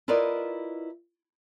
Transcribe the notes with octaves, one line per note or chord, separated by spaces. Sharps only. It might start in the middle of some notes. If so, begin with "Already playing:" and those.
E4 F4 A#4 B4 D5 D#5